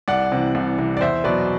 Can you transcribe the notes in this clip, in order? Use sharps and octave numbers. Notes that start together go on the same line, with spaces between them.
C2 D5 F#5
C3 E3
C2
C3 E3
D5
E2 C5 E5
B2 F#3 B4 D5